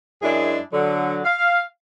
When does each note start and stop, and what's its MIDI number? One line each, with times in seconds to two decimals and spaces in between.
0.22 0.58 42
0.22 0.58 56
0.22 0.58 62
0.22 0.58 64
0.22 0.58 68
0.73 1.19 50
0.73 1.19 54
1.24 1.60 77